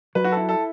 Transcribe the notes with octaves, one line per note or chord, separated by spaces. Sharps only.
F#3 B4
F#4
A4
E4
A4